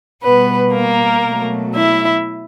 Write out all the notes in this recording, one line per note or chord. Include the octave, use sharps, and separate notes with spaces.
B2 G3 B3 B4
A#3 A#4
B2 F#3 A3
E4 E5